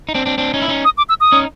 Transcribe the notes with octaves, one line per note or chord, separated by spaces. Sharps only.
D#4
C4 D4
C4 D4
C4 D4
C#4 D#4
E4
C#4 D#4
D#6
D6
E6
D#6
C#4 D#4